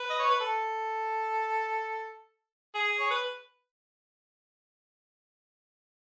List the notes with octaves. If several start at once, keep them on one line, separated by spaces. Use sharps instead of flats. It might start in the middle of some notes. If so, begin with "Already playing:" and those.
Already playing: B4
D#5
C#5
B4
A4
G#4
C#5
B4